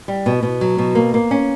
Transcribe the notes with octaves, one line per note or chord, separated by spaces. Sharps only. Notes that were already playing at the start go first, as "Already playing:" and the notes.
G3
B2
B2
F#3
B2
A#3
A#3
C#4